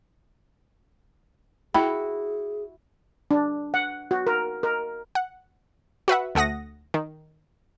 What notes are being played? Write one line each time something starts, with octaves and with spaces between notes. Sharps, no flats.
E4 F#4 G#4 G5 B5
D4
F#5
F#4
A#4
A#4
F#5
F#4 B4 E5 F#5
D2 A3 F#5 D#6 A#6
D#3